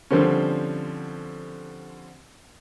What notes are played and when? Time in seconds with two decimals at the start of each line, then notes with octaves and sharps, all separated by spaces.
0.11 D3 F3 G3 C4 C#4